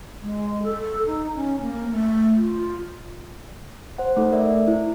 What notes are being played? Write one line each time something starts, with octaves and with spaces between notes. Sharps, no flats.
G#3
A4
D#4
C#4
A#3
A3
F4
C5 F#5
A3 D#4 A4
A#4 D5 E5
E4